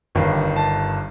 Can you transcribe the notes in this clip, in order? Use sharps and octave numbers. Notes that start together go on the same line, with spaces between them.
G1 G2 D#3
A5